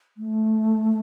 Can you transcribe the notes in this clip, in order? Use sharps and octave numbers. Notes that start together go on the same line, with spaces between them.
A3